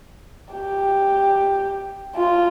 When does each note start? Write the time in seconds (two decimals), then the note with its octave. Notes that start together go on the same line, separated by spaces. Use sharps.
0.53 G4
2.16 F4